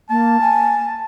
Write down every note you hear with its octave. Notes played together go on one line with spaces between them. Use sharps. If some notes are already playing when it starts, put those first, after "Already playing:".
A#3 A5
G#5